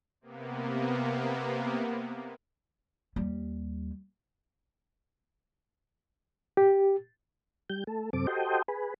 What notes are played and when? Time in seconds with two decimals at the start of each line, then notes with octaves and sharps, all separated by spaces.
0.21 C3 A#3 B3
3.16 D#2 G3
6.57 G4
7.70 G3 G6
7.87 A3 A4
8.13 F#2 C3 C4 A4 D6
8.27 F#4 G4 A4 C5 D#5 G5
8.68 G#4 B4